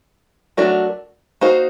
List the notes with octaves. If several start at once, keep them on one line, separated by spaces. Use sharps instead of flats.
F#3 A3 D4 F#4 A#4
A#3 D#4 F#4 C5